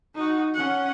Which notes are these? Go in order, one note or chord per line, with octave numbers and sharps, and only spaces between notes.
D#4 F#4
C#4 F#5